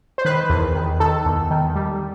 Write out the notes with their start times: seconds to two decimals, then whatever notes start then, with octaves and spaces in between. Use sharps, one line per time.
0.18 C5
0.25 D#3 B4
0.49 E2
0.75 D#3
1.00 D#3 A4
1.26 E2
1.51 D#3
1.75 G3